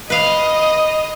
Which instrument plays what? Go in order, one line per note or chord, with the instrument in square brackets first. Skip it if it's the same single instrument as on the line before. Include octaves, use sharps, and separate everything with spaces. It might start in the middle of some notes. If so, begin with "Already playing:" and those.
[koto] B4 F5 [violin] D#5